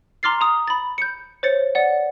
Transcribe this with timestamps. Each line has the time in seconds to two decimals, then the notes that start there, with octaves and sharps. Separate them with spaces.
0.23 A#5 C6 D6 F6 A6 C7
0.41 A#5 D#6
0.68 B5 A6
0.98 G6 C#7
1.43 C5 C#5 A6 C#7
1.75 D5 F#5